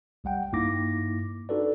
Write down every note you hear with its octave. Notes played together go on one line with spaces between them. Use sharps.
B1 G3 F#5 G5
G2 A#3 D#4 E4 D6 A#6
D4 D#4 F#4 A4 B4 D5